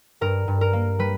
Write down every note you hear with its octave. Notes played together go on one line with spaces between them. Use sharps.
G2 A#4
G2
A#4
A#3
G3 B4